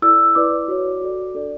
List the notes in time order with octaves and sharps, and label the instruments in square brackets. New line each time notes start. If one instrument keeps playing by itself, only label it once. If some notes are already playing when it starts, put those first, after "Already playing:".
[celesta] E4 A4 D5 E6
E4 B4 D5 D6
F#4 C#5
F#4 A4 D5
D4 A4 D5